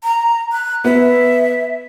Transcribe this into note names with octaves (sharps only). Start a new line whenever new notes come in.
A#5
F#6
B3 E5